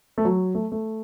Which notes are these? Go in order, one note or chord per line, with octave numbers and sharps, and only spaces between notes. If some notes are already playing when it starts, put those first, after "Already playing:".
A3
F#3
A3
A3